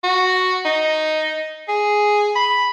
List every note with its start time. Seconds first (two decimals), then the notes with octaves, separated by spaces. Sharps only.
0.04 F#4
0.65 D#4
1.68 G#4
2.36 B5